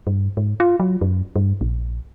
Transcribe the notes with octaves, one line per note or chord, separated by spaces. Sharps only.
G2
G#2
F4
F#3
F#2
G2
A#1